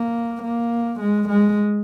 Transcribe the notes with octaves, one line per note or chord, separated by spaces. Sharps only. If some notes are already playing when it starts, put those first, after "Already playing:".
Already playing: A#3
A#3
G#3
G#3